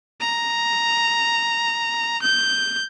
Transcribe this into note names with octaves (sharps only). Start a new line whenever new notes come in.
A#5
G6